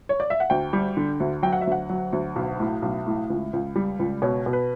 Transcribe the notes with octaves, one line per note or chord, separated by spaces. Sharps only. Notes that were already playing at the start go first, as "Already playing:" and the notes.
C#5
D5
E5
F#5
D2 G5
G3
D3
D2
F#3 G5
F#5
E5
D2 F#5
F#3
D2
B1
A2
B1
A2
C#2
C#2
G3
C#2
B2 C#5
B2
B4